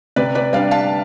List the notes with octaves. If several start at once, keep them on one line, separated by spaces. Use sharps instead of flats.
C3 B4 D5
B4 D5
G3 D4 D5 F5
F5 A5